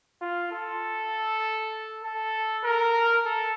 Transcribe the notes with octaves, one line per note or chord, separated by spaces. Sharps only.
F4
A4
A4
A#4
A4